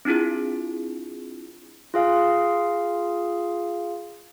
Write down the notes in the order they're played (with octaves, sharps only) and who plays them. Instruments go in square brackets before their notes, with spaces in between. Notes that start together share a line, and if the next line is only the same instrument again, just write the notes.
[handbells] C4 D4 E4 F4 G#4
F4 G#4 F5